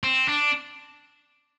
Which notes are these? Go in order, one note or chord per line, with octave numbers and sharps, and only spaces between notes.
C4
D4